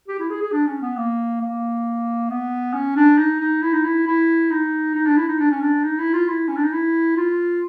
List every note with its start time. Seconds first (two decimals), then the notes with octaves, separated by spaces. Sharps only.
0.08 G4
0.19 E4
0.30 G#4
0.42 G#4
0.52 D4
0.67 C#4
0.82 B3
0.97 A#3
1.41 A#3
2.30 B3
2.74 C#4
2.96 D4
3.18 D#4
3.40 D#4
3.62 E4
3.73 D#4
3.84 E4
4.07 E4
4.51 D#4
4.95 D#4
5.06 D4
5.17 E4
5.28 D#4
5.40 D4
5.51 C#4
5.62 D4
5.84 D#4
5.99 E4
6.14 F4
6.28 E4
6.48 C#4
6.56 D4
6.64 D#4
6.72 E4
7.17 F4